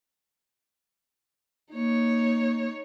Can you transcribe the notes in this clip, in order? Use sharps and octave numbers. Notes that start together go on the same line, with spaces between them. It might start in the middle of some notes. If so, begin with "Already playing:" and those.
A#3 D#4 C#5